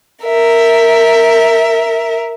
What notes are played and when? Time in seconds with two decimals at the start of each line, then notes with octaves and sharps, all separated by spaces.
0.25 A#4 E5